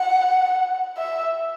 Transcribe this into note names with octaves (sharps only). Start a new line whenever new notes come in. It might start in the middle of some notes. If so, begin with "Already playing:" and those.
Already playing: F#5
E5